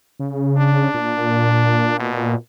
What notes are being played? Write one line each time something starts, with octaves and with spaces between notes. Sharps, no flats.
C#3
D4
A#2
B2